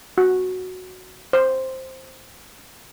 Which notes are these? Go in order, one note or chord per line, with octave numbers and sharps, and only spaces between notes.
F#4
C5